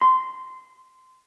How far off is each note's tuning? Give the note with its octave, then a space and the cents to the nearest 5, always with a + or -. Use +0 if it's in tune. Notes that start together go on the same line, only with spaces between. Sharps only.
C6 -15